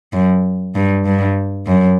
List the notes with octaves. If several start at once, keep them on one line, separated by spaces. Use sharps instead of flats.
F#2
G2
G2
F#2